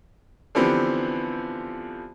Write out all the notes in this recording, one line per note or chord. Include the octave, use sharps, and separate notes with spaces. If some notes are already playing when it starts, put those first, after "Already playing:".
D3 E3 F3 B3 C4 G4